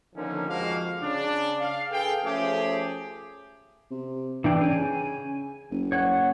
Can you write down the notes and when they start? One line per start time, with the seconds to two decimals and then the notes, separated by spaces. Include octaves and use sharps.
0.15 D3 D#3 F3 A3 A#3 C#4
0.48 F2 F3 G#3 A#3 F#4 F5
1.01 C#3 D4
1.60 F5
1.90 G#4 A4 B4 F5 G5
2.24 F3 A3 C#4 G4 G#4
3.90 C3
4.44 E3 D4 G5
4.61 C#3 G#5
5.70 F#1
5.92 C#5 F#5